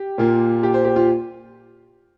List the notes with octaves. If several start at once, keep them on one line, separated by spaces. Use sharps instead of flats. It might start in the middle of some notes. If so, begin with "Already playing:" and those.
Already playing: G4
A#2 A#3 F4
G4
C5
G4
F4